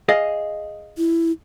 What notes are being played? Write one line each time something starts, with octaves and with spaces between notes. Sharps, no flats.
G#4 D#5 F5
E4